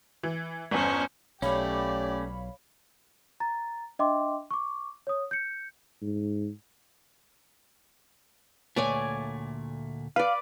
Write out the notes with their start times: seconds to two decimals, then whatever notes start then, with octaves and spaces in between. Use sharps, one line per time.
0.23 E3
0.71 G1 E2 C#4 C5
1.42 B1 A3 C#4 G4 C#5 D5 F5 B5
3.40 A#5 A6
3.99 D4 D#5 E5 G5 C6 D6
4.51 C#6 D6
5.07 C#5 D#6
5.31 G6 C#7
6.02 G#2
8.76 D2 A#2 A3 C#5 D5 G#5
10.16 B4 D5 F5